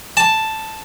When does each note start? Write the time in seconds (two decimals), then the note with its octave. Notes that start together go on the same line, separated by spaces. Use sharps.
0.17 A5